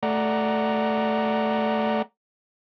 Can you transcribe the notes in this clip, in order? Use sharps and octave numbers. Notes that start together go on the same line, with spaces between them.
A3 D5 F#5 A#5